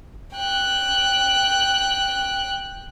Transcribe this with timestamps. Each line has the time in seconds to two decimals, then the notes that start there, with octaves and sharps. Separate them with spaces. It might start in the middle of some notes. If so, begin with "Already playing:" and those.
0.36 G5 F#6